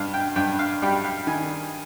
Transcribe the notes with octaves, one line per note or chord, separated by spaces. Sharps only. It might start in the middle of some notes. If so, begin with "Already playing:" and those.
Already playing: G2 F5
G5
G2 G5
F5
G3 G5
F5
D#3 G#5